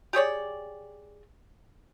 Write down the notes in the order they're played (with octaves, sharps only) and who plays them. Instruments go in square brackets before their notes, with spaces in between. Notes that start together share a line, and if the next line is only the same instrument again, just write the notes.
[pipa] G4 G#4 C#5 D5